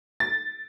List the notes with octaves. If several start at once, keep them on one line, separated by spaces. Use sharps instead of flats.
A6